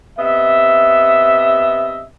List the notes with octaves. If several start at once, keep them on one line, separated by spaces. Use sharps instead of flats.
C3 B3 D#5 E5